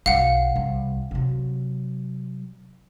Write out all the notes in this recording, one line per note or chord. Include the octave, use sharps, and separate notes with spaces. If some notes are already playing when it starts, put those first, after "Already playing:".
B1 F5 F#5
C2
C3 F#3